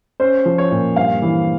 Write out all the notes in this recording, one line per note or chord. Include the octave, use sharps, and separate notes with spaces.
C#4 C5
F3
C#5
A#2
G2 F5
E3